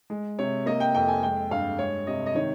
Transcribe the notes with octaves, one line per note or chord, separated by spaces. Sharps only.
G#3
C3 C#5
A#3 D#5
G5
F2 G5
G#5
G#3 G5
G2 F5
G#3 C#5
C3 D#5
D#5
D#3 C#5